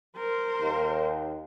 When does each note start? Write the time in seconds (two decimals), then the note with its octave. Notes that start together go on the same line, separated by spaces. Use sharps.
0.17 A#4 C5
0.61 D#2